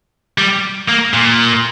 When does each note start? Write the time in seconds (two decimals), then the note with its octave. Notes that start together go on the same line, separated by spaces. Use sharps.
0.38 G3
0.88 A#3
1.14 A#2